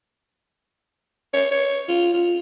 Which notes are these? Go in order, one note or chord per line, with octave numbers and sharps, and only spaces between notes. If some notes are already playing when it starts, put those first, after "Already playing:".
C#5
C#5
F4
F4